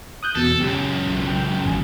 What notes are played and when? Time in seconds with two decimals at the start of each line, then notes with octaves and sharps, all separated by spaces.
0.23 D#6 F#6 G6
0.35 E2 B2 A4
0.60 C#2 F#2 G4
1.05 B1
1.28 G5
1.65 G1 D#2 G#5